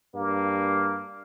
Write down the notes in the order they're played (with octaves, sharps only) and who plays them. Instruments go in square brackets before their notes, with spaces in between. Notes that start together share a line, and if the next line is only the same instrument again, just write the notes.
[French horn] G2 [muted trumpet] A#3